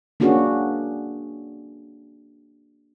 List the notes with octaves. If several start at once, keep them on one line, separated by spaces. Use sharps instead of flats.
A#3 C#4 D4 F#4 G#4